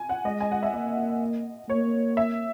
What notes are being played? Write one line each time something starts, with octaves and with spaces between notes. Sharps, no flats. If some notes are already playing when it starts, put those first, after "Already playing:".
Already playing: G#5
F#5
G#3 D#5
G#5
F#5
E5
A#3 D#5
A#3 C#5
E5